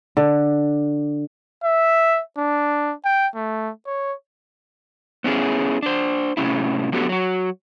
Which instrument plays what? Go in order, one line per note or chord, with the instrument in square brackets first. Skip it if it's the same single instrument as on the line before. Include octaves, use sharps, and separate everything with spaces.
[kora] D3
[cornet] E5
D4
G5
A3
C#5
[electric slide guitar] B3 C#4 E4 G#4
D4 C5
A2 C3 C#4 E4
D3 F#3 B3 F#4 G4 A4
F#3 F#4